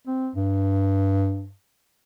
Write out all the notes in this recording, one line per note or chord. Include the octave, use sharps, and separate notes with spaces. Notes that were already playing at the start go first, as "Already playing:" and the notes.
C4
G2